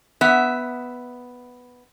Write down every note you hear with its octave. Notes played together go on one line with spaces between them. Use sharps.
B3 E5